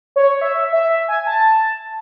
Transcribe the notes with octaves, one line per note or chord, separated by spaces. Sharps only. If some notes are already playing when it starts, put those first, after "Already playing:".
C#5
E5
E5
G#5
A5